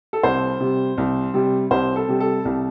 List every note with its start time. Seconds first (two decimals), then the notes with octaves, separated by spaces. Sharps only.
0.13 A4
0.23 C2 C5
0.60 C3 G3
0.98 C2
1.34 C3 G3
1.71 C2 C5
1.96 A4
2.08 C3 G3
2.20 A4
2.45 C2